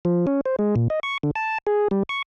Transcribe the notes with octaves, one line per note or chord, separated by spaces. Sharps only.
F3
C#4
C5
G#3
A#2
D#5
C#6
D3
A5
G#4
G3
C#6